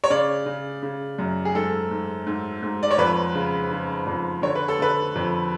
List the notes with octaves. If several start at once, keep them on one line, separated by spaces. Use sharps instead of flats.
C#5
C#3 D5
C#3
C#3
F#2
G#4
G#2 A4
G#2
G#2
G#2
D5
C#5
F2 B4
C#3
C#3
F2
D3 C#5
B4
A4
D3 B4
F2